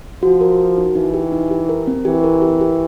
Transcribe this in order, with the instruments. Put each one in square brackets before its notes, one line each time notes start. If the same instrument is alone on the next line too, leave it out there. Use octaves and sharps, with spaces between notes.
[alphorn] F3 [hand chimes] F#4
[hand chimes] A#4
F#4
D#4
[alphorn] E3 [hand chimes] D#4
[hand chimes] G4
D#4
G4
A#4
C4
[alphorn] E3 [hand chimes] G4
[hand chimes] A#4
G4
G4